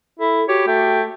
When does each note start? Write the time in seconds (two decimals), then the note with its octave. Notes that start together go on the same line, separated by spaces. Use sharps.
0.19 E4 A4
0.48 F#4 G4 C#5
0.67 A3 G5